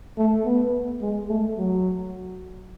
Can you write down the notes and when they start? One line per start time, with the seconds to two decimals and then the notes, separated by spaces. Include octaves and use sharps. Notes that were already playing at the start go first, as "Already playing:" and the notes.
0.18 A3
0.45 B3
1.02 G#3
1.29 A3
1.58 F#3